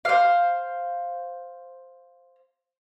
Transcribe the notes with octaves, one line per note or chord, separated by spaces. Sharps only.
C5 F5